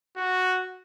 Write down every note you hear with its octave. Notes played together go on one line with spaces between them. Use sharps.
F#4